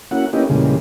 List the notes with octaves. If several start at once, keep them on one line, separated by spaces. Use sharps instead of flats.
A#3 C#4 E4 F#4 F#5
A#3 B3 C#4 D#4 E4 G4
E2 A#2 C#3 G3 G#3